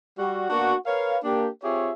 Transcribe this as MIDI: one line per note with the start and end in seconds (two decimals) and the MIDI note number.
0.19 0.47 55
0.19 0.47 66
0.50 0.75 58
0.50 0.75 59
0.50 0.75 62
0.50 0.75 66
0.86 1.16 70
0.86 1.16 71
0.86 1.16 73
0.86 1.16 77
1.24 1.48 58
1.24 1.48 62
1.24 1.48 67
1.63 1.91 60
1.63 1.91 65
1.63 1.91 67
1.63 1.91 68
1.63 1.91 73
1.63 1.91 76